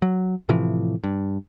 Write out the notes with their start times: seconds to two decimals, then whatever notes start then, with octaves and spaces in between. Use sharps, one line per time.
0.02 F#3
0.49 A2 C3 E3 F3
1.04 G2